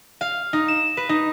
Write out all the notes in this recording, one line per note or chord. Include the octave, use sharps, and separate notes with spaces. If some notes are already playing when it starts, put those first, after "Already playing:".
F5
D#4
E7
B4
D#4